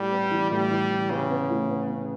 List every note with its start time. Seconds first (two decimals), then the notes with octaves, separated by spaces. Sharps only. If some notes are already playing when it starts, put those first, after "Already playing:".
Already playing: A2 G3
0.11 B3
0.31 E3
0.51 A2 G3
0.71 E3
0.91 E3
1.11 C#3 B3
1.30 B3
1.50 A2
1.70 B3
1.90 B3